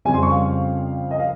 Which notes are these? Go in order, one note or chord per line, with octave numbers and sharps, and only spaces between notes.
F2 C#3 G3 C4 G#5
C6
C#6
F5
D#5
F5